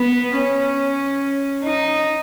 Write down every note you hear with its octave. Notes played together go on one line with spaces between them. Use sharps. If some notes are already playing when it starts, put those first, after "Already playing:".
Already playing: B3
C#4
D#4